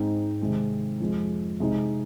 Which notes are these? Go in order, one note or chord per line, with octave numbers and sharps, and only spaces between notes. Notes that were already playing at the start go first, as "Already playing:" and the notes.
Already playing: G#2 G#3 C4 D#4
C3 D#3 G#3 C4
F2 F3 G#3
C3 G#3 D#4